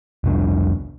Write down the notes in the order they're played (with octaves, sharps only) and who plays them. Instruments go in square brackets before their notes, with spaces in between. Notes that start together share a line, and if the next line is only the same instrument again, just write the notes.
[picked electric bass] F1 C2 D4